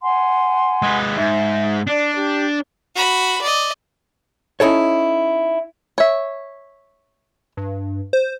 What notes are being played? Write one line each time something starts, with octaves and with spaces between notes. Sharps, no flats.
F#5 G#5 C6
G#3 B4
G#2 E5
D4 D5
G4
F#4 B5
D5 D#5
C#4 D#4 E4 A4 C#5
C#5 E5
G2
C5